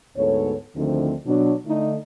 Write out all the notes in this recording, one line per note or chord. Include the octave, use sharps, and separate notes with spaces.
D2 G#2 B3 A4 C#5
D2 D3 D#3 F3 A3 C4
B2 F#3 D4
D3 A3 D#4